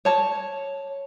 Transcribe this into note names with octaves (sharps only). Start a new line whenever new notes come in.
C#5 A5